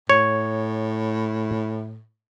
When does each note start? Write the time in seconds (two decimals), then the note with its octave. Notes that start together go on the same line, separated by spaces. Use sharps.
0.10 A2 C#5